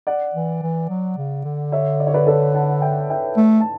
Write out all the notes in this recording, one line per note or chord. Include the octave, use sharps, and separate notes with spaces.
D5 F#5
E3
E3
F#3
C#3
D3
C#5 E5
D5
C#5
B4 D5
A4 C#5
F#5 A5
E5 G5
E5 G5
A3
A5